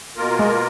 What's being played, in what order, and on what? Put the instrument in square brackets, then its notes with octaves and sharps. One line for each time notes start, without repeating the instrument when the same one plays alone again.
[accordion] B2 A#3 F4 A#4
[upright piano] G#3